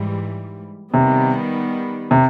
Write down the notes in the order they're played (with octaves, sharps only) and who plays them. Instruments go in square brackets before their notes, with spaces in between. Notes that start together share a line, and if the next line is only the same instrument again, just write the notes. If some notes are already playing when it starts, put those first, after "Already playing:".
Already playing: [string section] G#2 E3 G3
[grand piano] C3 [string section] D#3 G3 B3
[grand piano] C3